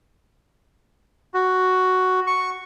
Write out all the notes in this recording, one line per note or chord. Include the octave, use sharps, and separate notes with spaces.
F#4
C#6